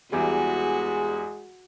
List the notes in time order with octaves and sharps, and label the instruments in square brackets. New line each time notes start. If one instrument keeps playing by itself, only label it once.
[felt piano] E2 E3 G3 [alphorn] G#3 [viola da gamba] F#4